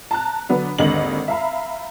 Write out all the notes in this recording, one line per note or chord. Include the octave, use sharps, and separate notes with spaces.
A5 A#5 F#6
D3 F#3 B3 D4
G#1 D#2 D3 D#5 F#7
E5 F5 A#5 B5